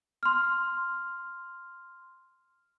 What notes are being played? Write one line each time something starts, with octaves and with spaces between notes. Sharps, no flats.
C6 F6